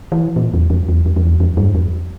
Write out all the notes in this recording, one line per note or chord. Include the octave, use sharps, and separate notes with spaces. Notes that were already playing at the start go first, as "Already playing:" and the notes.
E3
A#2
E2
F2
E2
F2
F2
E2
F2
G2
F2